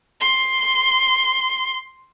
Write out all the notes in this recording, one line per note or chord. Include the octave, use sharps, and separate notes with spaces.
C6